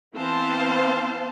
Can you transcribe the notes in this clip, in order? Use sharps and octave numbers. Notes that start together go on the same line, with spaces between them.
E3 B3 C4 C5 F5 A5